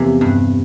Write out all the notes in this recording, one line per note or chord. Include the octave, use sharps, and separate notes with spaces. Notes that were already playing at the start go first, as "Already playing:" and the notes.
Already playing: E2 C3 E3 F3
G2